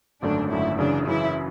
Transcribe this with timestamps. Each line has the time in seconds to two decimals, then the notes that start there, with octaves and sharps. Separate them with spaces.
0.22 G#1 F#2 D3 A3 C#4 D4
0.51 G#1 F#2 D3 A3 C#4 E4
0.78 F#2 C#3 E3 D4
1.07 F#2 C#3 E3 E4